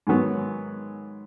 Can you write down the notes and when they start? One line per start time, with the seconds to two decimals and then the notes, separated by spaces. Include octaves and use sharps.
0.07 G#2 D#3 F#3 B3